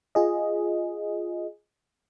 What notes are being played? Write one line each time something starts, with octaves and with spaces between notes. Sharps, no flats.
F4 G#4 D#5